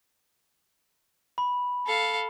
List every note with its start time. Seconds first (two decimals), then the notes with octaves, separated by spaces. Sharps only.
1.38 B5
1.86 A4 F5